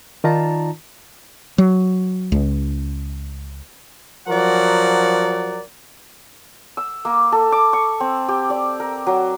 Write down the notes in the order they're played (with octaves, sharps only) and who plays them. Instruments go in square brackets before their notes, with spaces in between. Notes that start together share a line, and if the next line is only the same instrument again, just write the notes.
[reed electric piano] D#3 D#4 F4 D5 A5 A#5
[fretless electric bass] F#3
C#2
[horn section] F3 F#3 A#4 D5 F#5
[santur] E6
A#3
A4
D6
C#6
C4
G4
D5
A#4
F#3